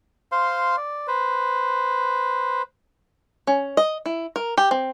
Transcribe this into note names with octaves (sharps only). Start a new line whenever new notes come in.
C5 F5 C6
D5
B4 C5
C#4
D#5
E4
A#4
G4
C4